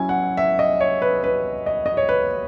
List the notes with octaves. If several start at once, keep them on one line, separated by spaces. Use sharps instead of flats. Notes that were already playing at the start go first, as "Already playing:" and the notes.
Already playing: F#3 C#4 E4 G#5
F#5
E5
D#5
C#5
B4
B4
D#5
D#5
C#5
B4